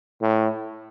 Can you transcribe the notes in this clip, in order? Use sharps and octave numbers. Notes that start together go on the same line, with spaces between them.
A2